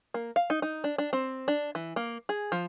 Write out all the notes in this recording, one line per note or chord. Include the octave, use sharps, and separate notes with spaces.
A#3
F5
D#4
D#4
D4
D4
C4
D4
E3
A#3
G#4
F3